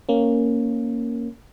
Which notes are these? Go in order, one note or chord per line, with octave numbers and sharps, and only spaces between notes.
A#3 C#4